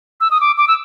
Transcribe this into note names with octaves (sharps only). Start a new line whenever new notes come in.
E6
D#6
D6
D6
E6